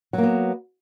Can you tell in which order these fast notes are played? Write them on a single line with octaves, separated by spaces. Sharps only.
F#3 A#3 B3